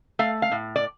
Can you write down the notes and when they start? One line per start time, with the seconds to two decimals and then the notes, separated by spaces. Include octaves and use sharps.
0.19 A3 F5
0.42 F5
0.52 A2
0.76 D5